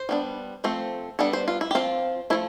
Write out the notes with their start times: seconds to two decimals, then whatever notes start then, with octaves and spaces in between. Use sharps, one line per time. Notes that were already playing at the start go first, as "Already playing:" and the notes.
Already playing: C5
0.09 G3 B3 D4
0.64 F3 A3 C4
1.19 G3 B3 D4 A4
1.33 C5
1.48 F4
1.61 E4
1.71 G4
1.75 F3 C4 F4
2.30 F3 A3 E4